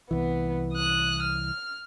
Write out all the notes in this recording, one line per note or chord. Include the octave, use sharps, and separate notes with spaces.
C2 E3 B3
D#6 F#6
F6